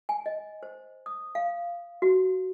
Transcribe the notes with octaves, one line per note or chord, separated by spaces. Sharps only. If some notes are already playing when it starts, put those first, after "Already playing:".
G#5
D#5
C5
D#6
F5
F#4